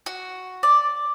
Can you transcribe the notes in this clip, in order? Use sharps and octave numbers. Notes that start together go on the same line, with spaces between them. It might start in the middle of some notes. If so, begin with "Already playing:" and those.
F#4
D5